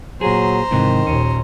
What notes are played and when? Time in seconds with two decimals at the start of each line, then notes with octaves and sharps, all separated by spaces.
0.21 A#2 F#3 G#4 C5 A#5
0.71 G#2 C3 D#3 E3
1.07 D#2 A#2 C#4